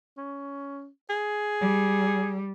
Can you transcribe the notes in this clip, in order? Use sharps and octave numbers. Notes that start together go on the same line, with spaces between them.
C#4
G#4
G3